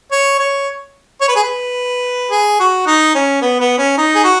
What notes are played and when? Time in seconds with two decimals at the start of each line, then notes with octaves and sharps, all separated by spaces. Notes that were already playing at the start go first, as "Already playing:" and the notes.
0.12 C#5
0.39 C#5
1.21 C#5
1.28 B4
1.36 G#4
1.43 B4
2.31 G#4
2.60 F#4
2.86 D#4
3.15 C#4
3.41 B3
3.60 B3
3.78 C#4
3.98 D#4
4.15 G#4
4.24 F#4